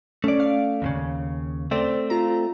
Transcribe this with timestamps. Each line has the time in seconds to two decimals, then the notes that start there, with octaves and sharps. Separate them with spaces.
0.24 A3 C#4 D5
0.40 F5
0.82 D#2 A#2 C#3
1.71 A3 C4 C5 D5
2.10 F4 A#5